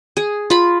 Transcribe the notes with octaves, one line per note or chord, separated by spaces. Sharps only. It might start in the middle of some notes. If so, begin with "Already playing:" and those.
G#4
F4 B5